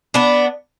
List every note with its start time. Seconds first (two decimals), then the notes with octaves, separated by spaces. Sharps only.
0.14 B3 D4